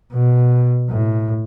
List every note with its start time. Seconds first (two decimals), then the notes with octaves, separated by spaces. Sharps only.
0.12 B2
0.89 A2